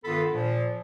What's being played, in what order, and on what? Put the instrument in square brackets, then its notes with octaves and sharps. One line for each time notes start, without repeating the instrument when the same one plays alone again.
[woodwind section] G2 D#3 B3 F4 A4 B5
A#2 F3